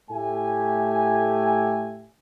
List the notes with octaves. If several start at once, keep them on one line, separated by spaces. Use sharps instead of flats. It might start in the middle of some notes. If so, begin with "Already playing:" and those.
A2 A3 G4 E5 G#5